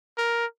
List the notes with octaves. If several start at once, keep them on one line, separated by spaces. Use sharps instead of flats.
A#4